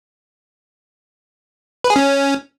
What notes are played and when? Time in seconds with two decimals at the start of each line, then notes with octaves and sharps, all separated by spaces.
1.84 B4
1.90 G#4
1.96 C#4